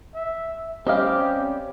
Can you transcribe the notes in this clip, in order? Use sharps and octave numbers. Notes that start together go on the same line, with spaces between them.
E5
G3 C4 C#4 G4 D#5 F5